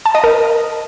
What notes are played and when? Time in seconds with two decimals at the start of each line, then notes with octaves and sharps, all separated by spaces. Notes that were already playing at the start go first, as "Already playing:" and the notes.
0.06 A5
0.15 D#5
0.24 A#4